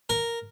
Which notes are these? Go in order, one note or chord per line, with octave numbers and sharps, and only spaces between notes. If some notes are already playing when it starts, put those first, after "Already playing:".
A#4